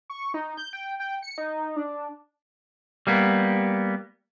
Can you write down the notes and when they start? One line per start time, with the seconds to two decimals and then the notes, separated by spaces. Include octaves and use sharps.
0.10 C#6
0.34 D#4
0.57 G6
0.73 G5
1.00 G5
1.22 C#7
1.38 D#4
1.76 D4
3.07 G3 A#3 B3